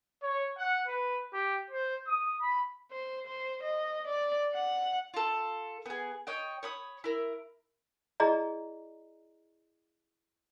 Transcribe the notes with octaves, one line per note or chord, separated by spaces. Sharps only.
C#5
F#5
B4
G4
C5
D#6
B5
C5
C5
D#5
D5
F#5
F4 A4
B3 G#4
C#5 D#5 G5
C#5 B5 D#6
E4 A#4
E4 G#4 D5 D#5 A#5